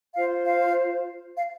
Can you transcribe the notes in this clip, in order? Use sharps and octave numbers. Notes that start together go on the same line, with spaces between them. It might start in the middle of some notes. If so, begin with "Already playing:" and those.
F4 C5 F5
F5
F5